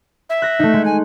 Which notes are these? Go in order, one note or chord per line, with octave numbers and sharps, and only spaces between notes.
E5
F#6 A#6
A3 D#4
G#3
G#5